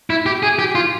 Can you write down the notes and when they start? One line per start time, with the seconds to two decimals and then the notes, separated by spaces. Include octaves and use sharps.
0.10 E4
0.26 G4
0.43 G#4
0.59 G4
0.75 F4